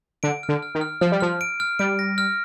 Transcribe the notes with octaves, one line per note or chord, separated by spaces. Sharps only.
D3 D7
F6
D3
F6
D#3
F6
F3 F6
G3
F3 F6
D7
F6
G3 D7
A#6
F6